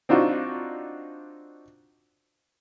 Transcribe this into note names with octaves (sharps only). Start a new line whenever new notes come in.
C4 D4 D#4 F4 F#4